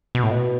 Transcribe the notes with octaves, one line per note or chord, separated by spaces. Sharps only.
B2
A2
B2